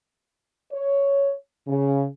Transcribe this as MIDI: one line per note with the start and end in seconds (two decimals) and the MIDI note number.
0.72 1.32 73
1.68 2.05 49